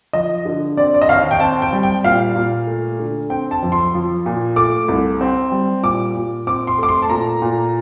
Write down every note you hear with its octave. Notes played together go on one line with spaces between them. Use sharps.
F3 D#5
D3
C4 D5
D5
D#5
D#2 F5
G5
C4 A5
G5
G3
G5
A#2 F5
A#2
A3
D3
C4 G5
A5
F2
C6
F3
A#2
A3 D6
C2
C4
G3
A#2 D6
A#2
C4 D6
C6
A3 D6
C6
A5
A#2 A#5
A#2